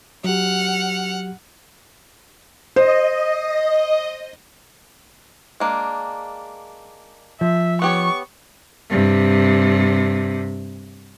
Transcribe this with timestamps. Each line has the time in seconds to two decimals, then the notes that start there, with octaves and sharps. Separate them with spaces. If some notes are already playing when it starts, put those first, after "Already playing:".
0.24 F#3 G4 F#5 F6
2.76 C5 D#5
5.60 G#3 A#3 D4
7.41 F3 E5
7.82 B3 G4 C#5 C#6
8.90 G2 C3